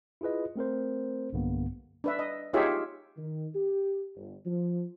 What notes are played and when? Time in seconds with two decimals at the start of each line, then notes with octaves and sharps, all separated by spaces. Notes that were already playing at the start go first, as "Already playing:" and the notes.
0.21 E4 F4 G#4 B4 D#5
0.56 A3 C4 A#4 C5
1.33 B1 G2 D3 A#3 B3
2.04 D4 B4 E5
2.19 D#5
2.53 D#4 F4 G4 G#4 C#5 E5
3.17 D#3
3.55 G4
4.16 G1
4.46 F3